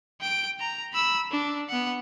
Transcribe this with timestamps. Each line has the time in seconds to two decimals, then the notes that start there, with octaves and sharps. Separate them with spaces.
0.21 G5 D7
0.60 A#5
0.94 B5 E6
1.31 D4
1.69 B3 F#5